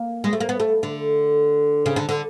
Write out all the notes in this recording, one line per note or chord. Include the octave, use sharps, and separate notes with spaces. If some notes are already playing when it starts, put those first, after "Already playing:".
Already playing: A#3
G#3
A3
A#3
B3
A3
D3
C#3
D3
D3